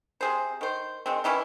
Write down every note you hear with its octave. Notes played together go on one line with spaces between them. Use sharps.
C3 G#4 C5
D#3 C5
D#3 G#3 C4
D#3 E3 C#4 E4